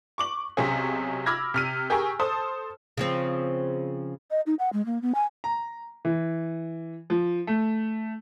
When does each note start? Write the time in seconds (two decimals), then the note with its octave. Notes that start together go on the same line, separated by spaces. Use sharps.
0.18 C#6 D6 F#7
0.57 B1 C3 C4 C#4 G#4
1.26 B5 D6 E6 F6 G#6 A#6
1.54 C3 F6 D#7
1.90 G4 G#4 A#4 G#5 C#6 E6
2.19 A4 C5 A5 D#6
2.97 C#3 F3 C4
4.31 D#5
4.46 D#4
4.59 F#5
4.73 G#3
4.86 A#3
5.02 B3
5.15 G#5
5.44 A#5
6.05 E3
7.10 F3
7.47 A3